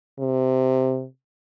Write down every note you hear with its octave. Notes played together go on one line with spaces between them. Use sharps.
C3